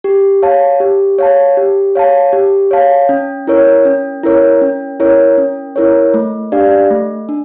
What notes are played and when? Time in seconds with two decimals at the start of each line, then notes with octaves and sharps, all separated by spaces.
0.04 G4
0.43 C#5 F5 A5
0.80 G4
1.19 C#5 F5 A5
1.57 G4
1.95 C#5 F5 A5
2.33 G4
2.71 C#5 F5 A5
3.09 C#4
3.47 E4 A#4 C#5
3.85 C#4
4.23 E4 A#4 C#5
4.62 C#4
5.00 E4 A#4 C#5
5.38 C#4
5.76 E4 A#4 C#5
6.14 A3
6.52 D4 G4 D5 F5
6.91 A3
7.29 D4